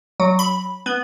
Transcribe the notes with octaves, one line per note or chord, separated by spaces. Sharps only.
F#3
B5
B3